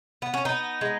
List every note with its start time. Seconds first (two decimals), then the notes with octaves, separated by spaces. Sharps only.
0.22 B3
0.34 C#4
0.45 B3 D#4
0.81 G#3